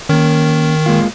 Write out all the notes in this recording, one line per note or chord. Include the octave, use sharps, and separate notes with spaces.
D#3 A#3 C#4
G#3 A#3 F4